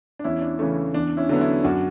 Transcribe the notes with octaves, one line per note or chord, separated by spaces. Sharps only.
D4
E2 C#4 E4
D4
C#3 E3 A3 C#4
E2 D4
C#4 E4
D3 F#3 B3
C#4 E4
F#2 D4 F#4